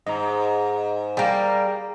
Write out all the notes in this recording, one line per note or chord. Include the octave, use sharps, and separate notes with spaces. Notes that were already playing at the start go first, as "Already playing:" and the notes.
G#2 D#5 A#5
G3 A#3 G#4 G5 A#5